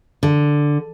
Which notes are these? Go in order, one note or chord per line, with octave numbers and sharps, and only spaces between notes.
D3